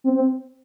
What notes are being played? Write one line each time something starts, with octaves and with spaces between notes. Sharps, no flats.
C4
C4